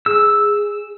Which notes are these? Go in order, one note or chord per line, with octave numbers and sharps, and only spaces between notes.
G#4 E6